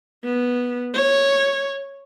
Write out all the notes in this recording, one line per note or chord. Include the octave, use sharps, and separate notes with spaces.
B3
C#5